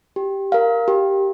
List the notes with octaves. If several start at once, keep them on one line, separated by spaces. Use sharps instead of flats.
G4
A#4 F5
G4